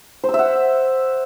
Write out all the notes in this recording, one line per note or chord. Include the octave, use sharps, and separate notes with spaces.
C5
E6
E5
F#5